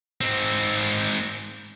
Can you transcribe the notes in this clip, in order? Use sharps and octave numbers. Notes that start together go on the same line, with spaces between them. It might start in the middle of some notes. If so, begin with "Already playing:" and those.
G#2 C4